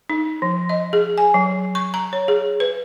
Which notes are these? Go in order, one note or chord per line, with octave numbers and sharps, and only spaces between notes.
D#4
F3
D#5
G#4
G#5
F#3
C#6
A#5
C#5
G#4
B4